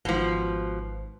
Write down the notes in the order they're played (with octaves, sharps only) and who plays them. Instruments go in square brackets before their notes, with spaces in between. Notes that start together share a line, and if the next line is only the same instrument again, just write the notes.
[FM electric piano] G#1 G#2 [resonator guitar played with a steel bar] B2 F3